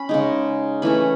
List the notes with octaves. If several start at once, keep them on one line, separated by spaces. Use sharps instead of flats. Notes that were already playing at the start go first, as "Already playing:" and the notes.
Already playing: C#4 B5
C#3 G#3 D#4
E3 A3 C#4 B5